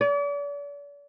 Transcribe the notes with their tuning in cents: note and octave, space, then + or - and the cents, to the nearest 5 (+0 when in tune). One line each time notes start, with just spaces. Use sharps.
D5 -40